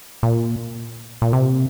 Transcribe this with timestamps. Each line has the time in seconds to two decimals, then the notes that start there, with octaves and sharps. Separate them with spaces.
0.23 A#2
1.22 A#2
1.33 C3